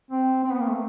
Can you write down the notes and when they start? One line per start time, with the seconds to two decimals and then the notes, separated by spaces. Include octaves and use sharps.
0.11 C4
0.44 C4
0.53 B3
0.60 A#3
0.68 A3